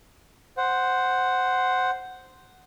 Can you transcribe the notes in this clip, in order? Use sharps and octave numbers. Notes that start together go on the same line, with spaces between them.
C5 F#5